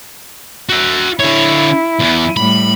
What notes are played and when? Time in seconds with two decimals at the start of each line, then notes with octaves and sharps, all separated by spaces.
0.69 F#4 E5
1.20 D3 E4 C#5
2.00 E2 E3
2.37 A2 G3 B5